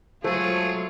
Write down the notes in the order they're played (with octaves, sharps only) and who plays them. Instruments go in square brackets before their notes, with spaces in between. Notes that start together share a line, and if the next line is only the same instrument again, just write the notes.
[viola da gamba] F#3 F4 [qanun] G#3 A3 [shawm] G#4 [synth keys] A4 C5 A5